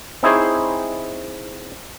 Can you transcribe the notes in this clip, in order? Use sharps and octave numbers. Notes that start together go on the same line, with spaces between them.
C4 D#4 E4 G#4 C5 C#5